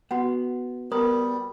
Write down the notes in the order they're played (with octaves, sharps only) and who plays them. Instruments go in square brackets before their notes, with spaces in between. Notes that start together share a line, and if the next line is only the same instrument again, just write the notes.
[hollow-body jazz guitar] B3 [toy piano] F#4 F#5
[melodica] G3 [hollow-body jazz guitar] B3 [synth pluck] A#4 [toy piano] D#6